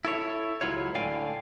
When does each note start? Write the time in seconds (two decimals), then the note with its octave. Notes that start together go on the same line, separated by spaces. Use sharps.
0.05 E4 A4 C#5
0.61 C#2 F#3 E4 F4 C#5
0.95 A2 D3 D5 F5 G5 G#5